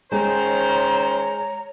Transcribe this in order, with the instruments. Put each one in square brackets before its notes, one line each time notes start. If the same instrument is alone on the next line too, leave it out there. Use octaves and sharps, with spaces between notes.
[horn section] D#3 C#4 C5 [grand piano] G#3 [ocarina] C#5 [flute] A#5